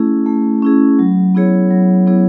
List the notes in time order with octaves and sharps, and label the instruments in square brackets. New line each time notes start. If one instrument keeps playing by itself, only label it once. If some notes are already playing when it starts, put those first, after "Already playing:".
Already playing: [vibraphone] A3 C#4 E4 G#4
A3
C#4 E4 G#4
F#3
B3 E4 G#4 C#5
F#3
B3 E4 G#4 C#5